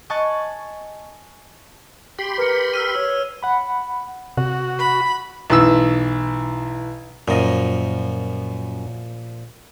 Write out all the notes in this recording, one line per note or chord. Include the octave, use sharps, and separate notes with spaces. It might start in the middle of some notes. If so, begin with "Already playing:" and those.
D#5 G#5 A5 C#6 F#6 A6
G4 G5 B5 C6
A#4 B4 C#7
E6 F6 D#7
C#5 E6
F#5 B5
C3 F#4
B5
B1 E3 E6
F#2 A#2 F3 D#5